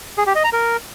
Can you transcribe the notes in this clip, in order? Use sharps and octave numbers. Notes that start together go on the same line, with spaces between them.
G#4
G4
D#5
A#5
A#4